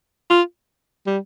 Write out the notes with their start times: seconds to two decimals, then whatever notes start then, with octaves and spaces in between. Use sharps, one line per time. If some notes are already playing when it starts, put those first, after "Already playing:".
0.30 F4
1.06 G3